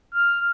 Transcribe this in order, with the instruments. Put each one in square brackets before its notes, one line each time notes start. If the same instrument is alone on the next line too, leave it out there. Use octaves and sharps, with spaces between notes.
[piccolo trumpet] F6